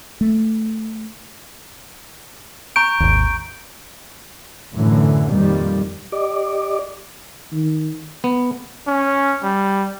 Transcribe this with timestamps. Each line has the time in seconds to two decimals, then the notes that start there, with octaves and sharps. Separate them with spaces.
0.21 A3
2.76 A#5 C#6 G6 D7
3.00 G#1 D#2
4.74 F#2 A2 D3 E3
5.30 F2 A#2 D#3 G3
6.12 G4 D5 D#5 D6
7.52 D#3
8.24 B3
8.87 C#4
9.43 G3